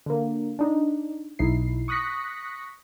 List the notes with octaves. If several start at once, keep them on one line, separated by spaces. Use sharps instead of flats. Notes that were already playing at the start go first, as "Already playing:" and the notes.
D3 A#3
D4 D#4
B1 D#4 E4 C7
C#6 D#6 F#6 A#6 B6 C#7